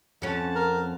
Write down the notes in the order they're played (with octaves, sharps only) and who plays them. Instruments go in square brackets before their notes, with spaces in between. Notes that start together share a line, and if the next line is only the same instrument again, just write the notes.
[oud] F2 C#4 [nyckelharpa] F#5 A5
[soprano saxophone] A#4